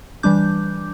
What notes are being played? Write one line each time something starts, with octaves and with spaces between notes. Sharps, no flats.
E3 G3 D4 D6 G6